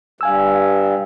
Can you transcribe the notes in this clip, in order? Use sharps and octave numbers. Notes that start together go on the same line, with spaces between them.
G2 F5 G#5 E6